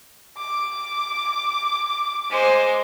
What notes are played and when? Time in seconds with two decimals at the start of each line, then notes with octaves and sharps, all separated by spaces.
0.38 D6
2.30 G#3 C5